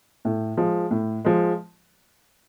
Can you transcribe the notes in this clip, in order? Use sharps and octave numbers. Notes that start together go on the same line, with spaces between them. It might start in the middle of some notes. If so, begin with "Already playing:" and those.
A2
F3 G#3
A2
F3 G#3